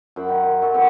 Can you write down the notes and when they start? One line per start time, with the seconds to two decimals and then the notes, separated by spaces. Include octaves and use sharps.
0.16 F#2 C5 B5
0.28 D#3
0.44 C5
0.62 F#3 A4
0.74 E3 A3 B3 C4